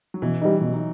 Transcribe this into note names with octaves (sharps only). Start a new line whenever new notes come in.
F#3
B2 E3
G3 D#4
B2 F#3
D#4